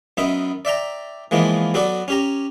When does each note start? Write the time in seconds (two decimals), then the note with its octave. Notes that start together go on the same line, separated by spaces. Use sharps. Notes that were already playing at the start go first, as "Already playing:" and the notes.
0.17 F#2 B3 D#4 E5
0.65 D5 E5 G5 A#5
1.31 E3 F3 G#3 A#3 B3
1.74 F#3 B3 F#4 A4 D5
2.08 C#4 G4 A#5